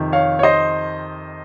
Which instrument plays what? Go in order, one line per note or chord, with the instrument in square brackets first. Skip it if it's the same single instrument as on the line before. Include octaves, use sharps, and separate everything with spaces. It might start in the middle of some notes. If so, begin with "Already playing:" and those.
Already playing: [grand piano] F2 C3 D#3
C#5 F5
C#5
C5 D#5